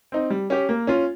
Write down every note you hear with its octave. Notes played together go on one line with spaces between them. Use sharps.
C4 D#4
G3
C#4 G4
A#3
C#4 F4